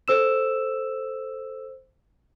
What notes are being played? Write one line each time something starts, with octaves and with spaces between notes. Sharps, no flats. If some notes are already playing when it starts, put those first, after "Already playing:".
A4 C5 E6 E7